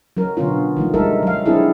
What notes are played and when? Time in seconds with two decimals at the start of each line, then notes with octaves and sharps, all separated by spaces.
0.17 F#3 C#4 A#4
0.37 B2 D3 B3 C#4 F4
0.77 D#3 F3 A3
0.94 G3 G#3 D#4 A4 A#4 E5
1.23 F#3 F5
1.46 B3 C4 D4 E4 G#4 A4